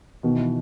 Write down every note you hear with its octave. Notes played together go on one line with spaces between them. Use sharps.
B2 D#3
E3